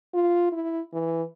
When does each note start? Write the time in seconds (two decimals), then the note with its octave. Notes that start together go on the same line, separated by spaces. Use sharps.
0.14 F4
0.52 E4
0.93 E3